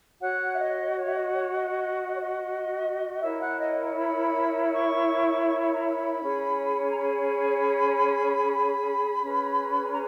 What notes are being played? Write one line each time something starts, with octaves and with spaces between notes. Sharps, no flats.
F#4 C#5 F#5
E5
D#5
C#5
E5
D#5
C#5
D#5
D#5
D#5
C#5
D#5
E4 A#4 C#5 E5
F#5
D#5
B5
B5
C#6
C#6
B5
A#5
B5
C#4 G#4 C#5
A#5
B5
C#4 G#4 B4
A#5